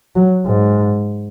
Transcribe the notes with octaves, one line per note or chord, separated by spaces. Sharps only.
F#3
G#2